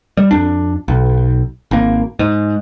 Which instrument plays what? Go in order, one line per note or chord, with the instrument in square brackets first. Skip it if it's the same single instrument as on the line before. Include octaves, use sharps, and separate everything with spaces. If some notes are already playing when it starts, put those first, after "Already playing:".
[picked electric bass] G3
F2 D4
B1
G#1 A#3
G#2